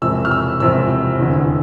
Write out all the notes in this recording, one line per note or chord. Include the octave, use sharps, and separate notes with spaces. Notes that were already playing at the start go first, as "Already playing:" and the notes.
E1 E2 C3 F3 C4 E6
F6
E6
E1 E2 C3 F3 C4 E6
F1 E2 D3